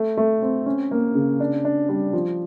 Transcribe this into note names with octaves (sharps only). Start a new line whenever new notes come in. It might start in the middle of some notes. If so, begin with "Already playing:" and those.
Already playing: A3
A3
C4
C#4
A#3
C#3
D4
D4
G3
F3